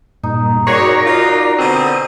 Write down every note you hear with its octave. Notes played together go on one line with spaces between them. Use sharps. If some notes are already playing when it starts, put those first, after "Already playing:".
G2 A#2 D#4
C4 F#4 G#4 A#4 C#5 D5 A#5
D#4 F4
B2 D3 C4 D#6